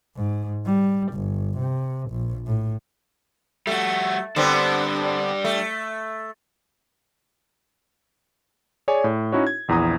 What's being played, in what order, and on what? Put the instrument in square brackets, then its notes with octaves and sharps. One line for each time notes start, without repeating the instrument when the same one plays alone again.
[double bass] G#2
G3
G1
C3
A#1
A2
[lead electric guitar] G3 F#4 [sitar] A3
[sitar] D3 B3 C4 [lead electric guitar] G3 D4
[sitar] A3
[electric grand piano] G#4 C#5 D5 G#5
A2
C#4 D#4 E4 F#4 C#5
G#6
A#1 E2 E4 A#5 D#6